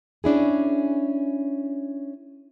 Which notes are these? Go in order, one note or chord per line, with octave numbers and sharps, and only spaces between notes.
C#4 D4 E4 G#4